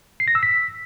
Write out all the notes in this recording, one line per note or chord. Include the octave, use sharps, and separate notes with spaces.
C7
A#6
E6
B6